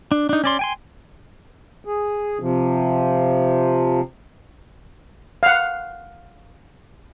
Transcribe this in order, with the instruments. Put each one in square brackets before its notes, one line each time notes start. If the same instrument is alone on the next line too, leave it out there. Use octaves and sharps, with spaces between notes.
[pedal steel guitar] D4
D4 D#4
C#4 D5 C6
G5 G#5 C6
[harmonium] G#4
C3 F3
[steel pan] F5 F#5